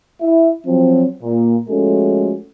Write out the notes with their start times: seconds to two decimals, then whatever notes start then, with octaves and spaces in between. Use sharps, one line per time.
0.21 E4 E5
0.67 F3 F#3 C4
1.23 A#2
1.69 F3 G#3 A3 C#4 F#4 A4